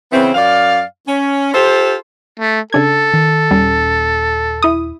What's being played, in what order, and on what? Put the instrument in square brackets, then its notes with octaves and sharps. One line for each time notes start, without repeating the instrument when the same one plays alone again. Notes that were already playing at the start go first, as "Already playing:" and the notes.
[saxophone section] C#3 E3 B3 C4
F#2 D5 F5
C#4
F4 G4 A4 C5
[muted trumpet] A3
[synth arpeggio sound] C#3 D4 G#6 [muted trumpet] A4
[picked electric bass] D#3
[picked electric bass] D#1 C#4 [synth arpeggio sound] G3
[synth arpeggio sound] E4 D#6